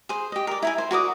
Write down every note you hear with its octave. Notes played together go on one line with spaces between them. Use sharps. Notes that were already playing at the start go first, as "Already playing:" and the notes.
G#4 C5
G4 D#5
A#4 D5
E4 A#4 G#5
C5
F#4 A#4 D5 D#6